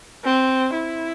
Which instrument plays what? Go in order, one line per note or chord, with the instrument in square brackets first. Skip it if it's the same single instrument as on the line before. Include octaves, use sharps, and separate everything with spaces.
[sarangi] C4
E4